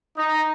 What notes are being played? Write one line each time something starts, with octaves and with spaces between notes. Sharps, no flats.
D#4